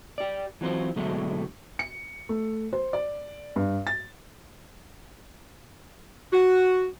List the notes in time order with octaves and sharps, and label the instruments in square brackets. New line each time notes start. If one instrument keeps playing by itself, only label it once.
[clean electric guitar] G4 D5
E3 F#3 C4 F4 C5
G#2 B2 D3 F#3 G#3 A3
[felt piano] C#7
A3
C5
D5
G2
A6
[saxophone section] F#4